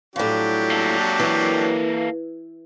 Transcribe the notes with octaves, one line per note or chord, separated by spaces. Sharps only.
A2 F3 F#3 D4 G4
A#3 A4
E3